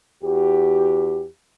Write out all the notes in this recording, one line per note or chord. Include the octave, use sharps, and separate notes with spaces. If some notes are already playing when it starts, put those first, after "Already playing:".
E2 F#4 G4